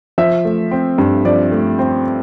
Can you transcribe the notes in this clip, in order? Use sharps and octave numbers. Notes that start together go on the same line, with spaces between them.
F3 E5
A3
C4
G2
F3 D5
A3
C4